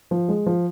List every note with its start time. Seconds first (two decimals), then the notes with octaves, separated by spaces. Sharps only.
0.11 F3
0.29 G#3
0.46 F3